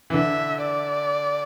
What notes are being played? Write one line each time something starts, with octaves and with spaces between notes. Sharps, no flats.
E3
D3 E5
D5